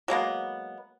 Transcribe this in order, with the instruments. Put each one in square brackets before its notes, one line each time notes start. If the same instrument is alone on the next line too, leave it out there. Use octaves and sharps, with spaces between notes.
[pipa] F#3 G#3 A#3 B3